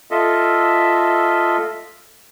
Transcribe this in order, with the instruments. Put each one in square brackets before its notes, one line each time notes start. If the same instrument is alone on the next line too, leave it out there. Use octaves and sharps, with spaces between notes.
[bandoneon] F4 A4 D#5 E5